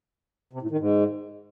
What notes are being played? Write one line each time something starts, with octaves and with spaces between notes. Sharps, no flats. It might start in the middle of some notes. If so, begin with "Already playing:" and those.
C3
A2
D#3
G#2